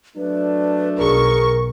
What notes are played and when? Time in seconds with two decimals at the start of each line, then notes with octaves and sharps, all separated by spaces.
0.17 F#3 A3 D4 B4
0.99 B1 G#4 A#4 C#6